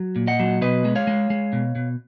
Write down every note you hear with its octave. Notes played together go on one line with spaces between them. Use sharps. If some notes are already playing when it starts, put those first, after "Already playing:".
Already playing: F#3
A#2
D#5 F#5
F#3
B2 B4 D#5
G#3
C#5 F5
G#3
G#3
B2
B2